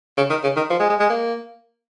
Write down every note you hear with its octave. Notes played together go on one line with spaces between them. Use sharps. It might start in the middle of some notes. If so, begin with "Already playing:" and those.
C#3
D#3
C#3
D#3
F3
G#3
G#3
G#3
A#3